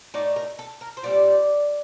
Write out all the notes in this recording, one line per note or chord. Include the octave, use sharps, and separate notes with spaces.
A2 A3 D#4 D5
A#4
A4
A#4
C5
A#2 G3 C4 D5